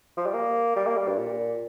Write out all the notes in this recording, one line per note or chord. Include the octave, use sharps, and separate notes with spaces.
F3
G3
A#3
G3
A#3
G3
G2
A#2